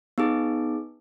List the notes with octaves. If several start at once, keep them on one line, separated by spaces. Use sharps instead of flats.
B3 D#4 G#4